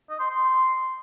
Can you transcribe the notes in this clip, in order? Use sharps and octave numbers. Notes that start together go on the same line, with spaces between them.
D#5
C6
C6